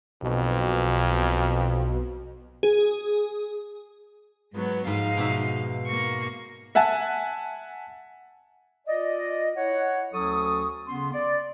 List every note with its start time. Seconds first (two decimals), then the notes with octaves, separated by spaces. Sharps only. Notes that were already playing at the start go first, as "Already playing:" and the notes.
0.22 B1 F2 B2
2.63 G#4
4.53 G#2 F#3 B3
4.87 G#2 F3 D#4 F5
5.17 B2 E5
5.87 A#3 C#6
6.75 E5 F#5 G#5 A5
8.87 F4 D5 D#5
9.56 E4 C#5 F#5
10.13 D2 F#3 C#4 A4 C#6 D#6
10.87 C#3 B3 C#4 C6
11.12 D5